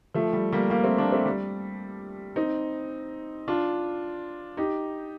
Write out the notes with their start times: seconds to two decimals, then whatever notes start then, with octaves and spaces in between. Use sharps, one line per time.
0.15 F3 A3
0.33 G3
0.52 G3 A#3
0.70 G3 A#3
0.84 A3 C4
0.98 A#3 D4
1.12 A3 C4
1.25 G3
2.36 C4 D#4
3.48 D4 F4
4.57 D#4 G4